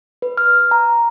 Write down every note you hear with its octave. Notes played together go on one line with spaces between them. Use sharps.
B4
F6
A#5